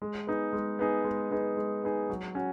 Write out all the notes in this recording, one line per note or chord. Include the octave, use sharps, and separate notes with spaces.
G#3
B3 D#4 G#4
G#3
B3 D#4 G#4
G#3
B3 D#4 G#4
G#3
B3 D#4 G#4
F#3
C#4 F#4